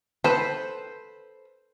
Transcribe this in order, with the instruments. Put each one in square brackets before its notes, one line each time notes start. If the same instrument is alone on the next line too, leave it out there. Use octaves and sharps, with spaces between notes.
[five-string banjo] A4 B4 [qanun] C5